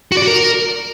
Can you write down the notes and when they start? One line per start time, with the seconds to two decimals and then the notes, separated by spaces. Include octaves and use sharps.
0.12 F#4
0.17 D5
0.22 F#4
0.27 A#4